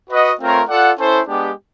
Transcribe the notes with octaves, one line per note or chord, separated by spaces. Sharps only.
F#4 B4 D#5 F#5
A3 C4 F4 A#4 C#5
F4 A4 D5 F#5
C#4 E4 A4 C5
G#3 B3 D4 G4